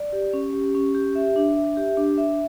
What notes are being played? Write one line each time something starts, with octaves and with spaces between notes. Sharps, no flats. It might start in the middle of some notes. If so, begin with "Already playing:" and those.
Already playing: D5
G4
C#4
G4
C#4
G4
E5
D4
E5
G4
D4
E5